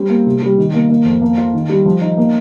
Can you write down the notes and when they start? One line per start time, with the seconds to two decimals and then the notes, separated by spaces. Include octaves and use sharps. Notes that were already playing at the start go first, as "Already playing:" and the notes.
Already playing: G3 C4
0.10 A#3
0.27 C3
0.42 G3
0.58 D#3
0.74 A#3
0.89 A#3
1.05 F2
1.22 A#3
1.38 F4
1.54 D#3
1.69 G3
1.86 F3
2.01 D#4
2.17 A#3